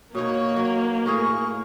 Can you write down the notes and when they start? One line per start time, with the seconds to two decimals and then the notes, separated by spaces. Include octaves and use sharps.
0.15 B2 A#3 D#4 C#5
0.57 F#3
1.06 A2 G#4 A#4 C#6